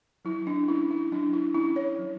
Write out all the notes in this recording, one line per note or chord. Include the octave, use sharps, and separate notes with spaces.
F#3 E4
D4
C#4 E4
E4
F#3 D4
E4
C#4 E4
C#5
F#3